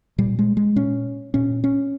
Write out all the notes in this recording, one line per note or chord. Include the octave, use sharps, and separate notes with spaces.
A#2 G3
G#3
G#3
A#2 C#4
A#2 C#4
C#4